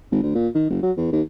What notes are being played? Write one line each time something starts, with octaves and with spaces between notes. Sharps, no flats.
G#1
D2
A#2
D#3
F#1
F#3
E2
D#2